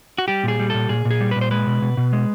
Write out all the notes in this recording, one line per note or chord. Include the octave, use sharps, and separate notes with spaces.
F#4
G3 G4
A#2 G#4
G3
A#2 A4
A#2 G#4
A#2
G#4
G3
A#2 B4
C5
G#3 B4
B2
B2
B2
G#3